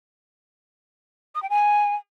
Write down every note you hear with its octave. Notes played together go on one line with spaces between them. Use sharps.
D#6
G5
G#5